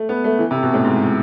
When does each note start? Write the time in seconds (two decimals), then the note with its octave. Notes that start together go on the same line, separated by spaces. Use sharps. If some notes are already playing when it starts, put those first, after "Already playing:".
Already playing: A3
0.09 B3
0.24 A3
0.39 E3
0.51 C3
0.63 B2
0.74 A2
0.85 G#2